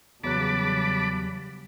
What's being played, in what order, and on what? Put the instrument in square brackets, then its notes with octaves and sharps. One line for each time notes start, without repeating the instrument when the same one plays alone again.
[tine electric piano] E2 F#3 F#6 [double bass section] C#3 G3 [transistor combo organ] A5 B5 D6